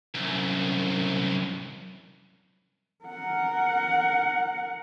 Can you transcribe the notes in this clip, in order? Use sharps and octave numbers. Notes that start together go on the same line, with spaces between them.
C2 F#2
A#4 F#5